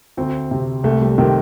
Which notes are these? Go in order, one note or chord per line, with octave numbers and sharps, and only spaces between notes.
D2 C4
C3
C2 A3
G3
C3 D#3